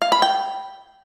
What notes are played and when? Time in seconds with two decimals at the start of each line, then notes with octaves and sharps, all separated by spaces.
0.02 F5
0.12 B5
0.22 G5